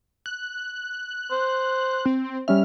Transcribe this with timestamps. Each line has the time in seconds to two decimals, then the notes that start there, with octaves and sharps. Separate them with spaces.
0.26 F#6
1.31 C5
2.05 C4
2.48 G3 C#4 E5 F6